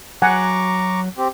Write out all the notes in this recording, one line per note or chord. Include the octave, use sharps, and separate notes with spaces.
F#3 F#5 G#5 A#5 C#6 D6
C4 G4